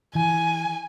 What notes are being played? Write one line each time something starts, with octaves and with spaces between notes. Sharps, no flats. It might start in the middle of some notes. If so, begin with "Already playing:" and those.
E3 G#5